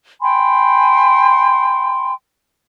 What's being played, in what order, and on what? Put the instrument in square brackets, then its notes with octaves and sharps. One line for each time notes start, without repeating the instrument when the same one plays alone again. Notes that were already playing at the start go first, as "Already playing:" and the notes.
[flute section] G5 G#5 B5 C6